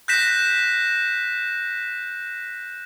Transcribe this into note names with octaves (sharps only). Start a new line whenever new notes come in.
F#6 G6 A#6 B6 E7